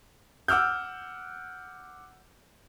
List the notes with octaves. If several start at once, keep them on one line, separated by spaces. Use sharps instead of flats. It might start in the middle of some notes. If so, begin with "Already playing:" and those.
F#5 D6 E6 F6 G6